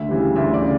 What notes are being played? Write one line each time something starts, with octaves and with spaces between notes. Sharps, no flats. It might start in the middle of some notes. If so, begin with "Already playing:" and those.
Already playing: D2 E5
C#3 E3 G3
D2 E5
D5
C#3